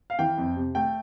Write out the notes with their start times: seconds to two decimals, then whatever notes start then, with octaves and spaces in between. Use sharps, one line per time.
0.10 F5
0.19 E3 G5
0.38 F2
0.56 C3
0.75 A3 G5